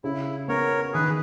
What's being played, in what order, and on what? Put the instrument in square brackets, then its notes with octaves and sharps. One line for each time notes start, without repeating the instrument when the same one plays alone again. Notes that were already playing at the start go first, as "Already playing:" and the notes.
[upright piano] C#3 [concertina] E4
[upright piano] B3 [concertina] A#4 C#5
[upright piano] D#3 [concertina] G#4 B4